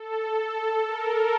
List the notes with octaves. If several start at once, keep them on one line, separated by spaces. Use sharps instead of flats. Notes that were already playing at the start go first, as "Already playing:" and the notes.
Already playing: A4
A4
A#4